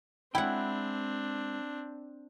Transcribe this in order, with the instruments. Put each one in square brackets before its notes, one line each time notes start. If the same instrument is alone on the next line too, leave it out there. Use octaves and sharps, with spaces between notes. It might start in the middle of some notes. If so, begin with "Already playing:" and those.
[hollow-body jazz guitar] G#3 G5 [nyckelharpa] C4 D4 [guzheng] E4 F#5